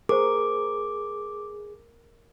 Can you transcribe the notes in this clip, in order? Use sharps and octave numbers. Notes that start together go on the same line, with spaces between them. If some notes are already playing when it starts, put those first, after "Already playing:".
G4 G#4 A#4 C5 D6